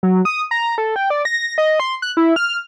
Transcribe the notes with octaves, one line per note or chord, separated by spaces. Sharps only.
F#3
D#6
A#5
A4
G5
D5
A#6
D#5
C6
F#6
E4
F6